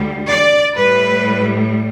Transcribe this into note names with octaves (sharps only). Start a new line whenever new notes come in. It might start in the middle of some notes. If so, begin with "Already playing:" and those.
Already playing: D2 D3 G3
D5
A2 G3 B4